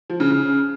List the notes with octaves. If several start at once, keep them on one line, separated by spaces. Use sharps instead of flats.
F3
C#3
C#3